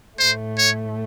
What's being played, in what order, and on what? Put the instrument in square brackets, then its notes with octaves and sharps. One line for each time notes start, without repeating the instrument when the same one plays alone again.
[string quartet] A2 A3 [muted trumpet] C5
[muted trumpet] C#5